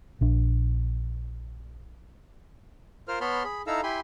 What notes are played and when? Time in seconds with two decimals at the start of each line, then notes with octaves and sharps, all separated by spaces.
0.21 A#1 D4
3.08 F4 A#4 C5 F6
3.21 B3 C#5 A5 B5 C6 F6
3.44 G#4 B5
3.67 D#4 E4 A4 F5 A#5 E6
3.83 E4 G4 G#5 B5 C6